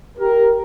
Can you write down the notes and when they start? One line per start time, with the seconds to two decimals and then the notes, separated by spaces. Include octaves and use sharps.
0.18 G4 A#4